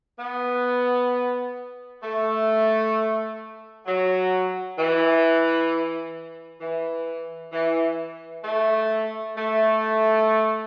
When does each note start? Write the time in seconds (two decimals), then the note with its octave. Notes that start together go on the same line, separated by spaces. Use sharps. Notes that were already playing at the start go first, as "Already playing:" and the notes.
0.19 B3
2.03 A3
3.86 F#3
4.78 E3
6.60 E3
7.52 E3
8.44 A3
9.36 A3